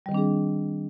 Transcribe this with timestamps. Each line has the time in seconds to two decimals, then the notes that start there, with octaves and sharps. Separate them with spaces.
0.06 G3
0.09 D#3
0.12 C4
0.14 D4
0.17 G#4